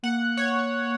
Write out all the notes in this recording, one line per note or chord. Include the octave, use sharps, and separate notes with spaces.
A#3 F#5
C#5